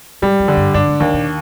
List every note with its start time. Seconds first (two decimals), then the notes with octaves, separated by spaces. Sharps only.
0.22 G#2 G3
0.40 F2
0.48 D3
0.57 G2
0.74 G2 D4
0.87 G#2
1.00 D#2 G#2
1.14 A#2